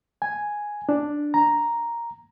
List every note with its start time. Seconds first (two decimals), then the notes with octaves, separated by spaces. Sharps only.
0.22 G#5
0.89 D4
1.34 A#5